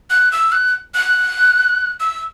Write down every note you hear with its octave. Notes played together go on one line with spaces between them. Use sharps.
F#6
E6
F#6
F#6
E6